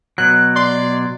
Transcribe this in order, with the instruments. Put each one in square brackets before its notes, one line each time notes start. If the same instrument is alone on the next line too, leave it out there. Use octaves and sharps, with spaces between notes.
[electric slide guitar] B2 F#3 [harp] F#6
[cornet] D5 [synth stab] C6